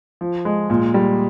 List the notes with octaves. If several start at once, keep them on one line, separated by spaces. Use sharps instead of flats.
F3
G#3
A#2
G3